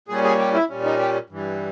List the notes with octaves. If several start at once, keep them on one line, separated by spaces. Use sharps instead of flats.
A#2 G3 C#4 G#4
G#4
G4
E4
A#2 G3 C#4
D#4
G4
G2 E3 G3